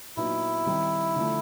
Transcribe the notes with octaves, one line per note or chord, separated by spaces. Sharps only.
A#2 F#3 B3 D#4 E4 F#4
D#3 G3 C4 D#4
D3 F3 A3